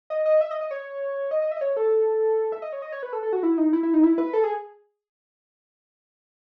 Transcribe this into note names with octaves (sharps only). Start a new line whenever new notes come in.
D#5
D#5
E5
D#5
D#5
C#5
D#5
D#5
E5
D#5
C#5
A4
E5
D#5
C#5
D#5
C#5
B4
A4
A4
F#4
E4
D#4
E4
E4
D#4
E4
B4
A4
G#4